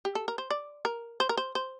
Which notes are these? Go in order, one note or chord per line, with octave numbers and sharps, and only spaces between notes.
G4
A4
A#4
C5
D5
A#4
C5
A#4
C5
C5